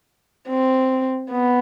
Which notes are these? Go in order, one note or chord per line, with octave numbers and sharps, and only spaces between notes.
C4
B3